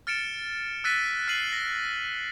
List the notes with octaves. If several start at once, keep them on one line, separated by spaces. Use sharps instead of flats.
F6 A6 C#7 D7 E7
E6 F#6 A6 B6 D#7
F6 F#6 C7 D#7 F#7
A#6